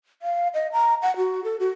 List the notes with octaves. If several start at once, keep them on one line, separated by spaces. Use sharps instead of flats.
F5
D#5
A#5
F#5
F#4
A4
F#4